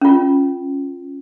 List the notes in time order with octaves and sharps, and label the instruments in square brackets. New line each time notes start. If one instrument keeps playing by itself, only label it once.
[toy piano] C#4 F4